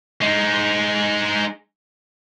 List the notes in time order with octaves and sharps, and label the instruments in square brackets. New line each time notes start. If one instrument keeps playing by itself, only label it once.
[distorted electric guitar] G#3 D#4